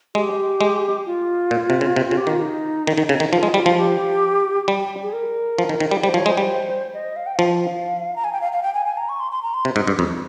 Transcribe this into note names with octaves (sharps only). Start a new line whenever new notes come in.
G#3 G4
G#3
F4
A#2
C3
C#3
C3
C#3
G4
D#3 F4
D#4
D#3
D#3
C#3
D#3
F3 F4
G#3
G3 F4
F3
G4
G3
G#4
A#4
F3
D#3
D#3
G3
G3 C5
F3 C#5
G#3
C5
G3
D#5
F5
G5
F3 F5
A#5
G#5
G5
F5
F5
G5
G#5
G#5
A#5
C#6
C6
C6
A#5
C6
C3
G#2
G2
F2